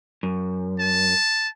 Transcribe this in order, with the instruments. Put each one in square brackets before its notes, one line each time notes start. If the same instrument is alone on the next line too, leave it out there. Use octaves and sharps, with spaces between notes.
[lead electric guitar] F#2
[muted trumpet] A5